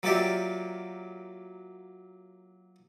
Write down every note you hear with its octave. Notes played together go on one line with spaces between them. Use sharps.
F#3 A#3 F4 G4 D5 E5